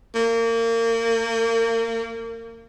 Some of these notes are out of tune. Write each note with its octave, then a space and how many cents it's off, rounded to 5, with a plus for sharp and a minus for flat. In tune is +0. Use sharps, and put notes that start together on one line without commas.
A#3 -30